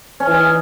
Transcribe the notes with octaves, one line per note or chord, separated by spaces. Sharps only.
C#4
E3
D#4